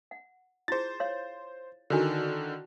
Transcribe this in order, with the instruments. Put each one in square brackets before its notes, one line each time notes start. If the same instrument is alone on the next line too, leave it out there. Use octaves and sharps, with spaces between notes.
[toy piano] F#5
[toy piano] E4 F4 G#4 [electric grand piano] C5 A6
[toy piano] C#5 F5 C6
[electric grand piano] D3 D#3 [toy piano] E4 F#4 G#5